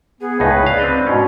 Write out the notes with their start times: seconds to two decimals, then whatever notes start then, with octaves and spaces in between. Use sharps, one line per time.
0.21 B3 G#4
0.40 C#2 A2 D#4 B4
0.66 D5 F5
0.79 C4 D4 D#5
1.07 G#2 B2 C#4